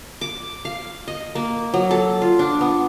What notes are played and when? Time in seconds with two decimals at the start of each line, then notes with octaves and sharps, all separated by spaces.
0.21 D6
0.65 F5
1.08 D#5
1.35 A#3
1.74 F#3
1.91 A4
2.22 F4
2.39 D4
2.61 B3